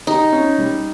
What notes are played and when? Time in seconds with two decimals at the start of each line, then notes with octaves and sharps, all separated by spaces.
0.07 D#4 G4
0.32 C#4
0.58 G3